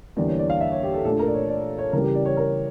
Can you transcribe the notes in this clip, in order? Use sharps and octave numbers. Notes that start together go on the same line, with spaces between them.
E2 D3 G3 A#3 E4 D5
C#5
D5
F5
E5
C#5
G4
A4
A#2 A3 D4 F4 A4
A#4
D5
C#5
D5
C#5
C#3 E3 G3 A#4
G4
D5
C#5
A#4